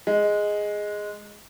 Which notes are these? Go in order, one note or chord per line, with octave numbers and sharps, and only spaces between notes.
G#3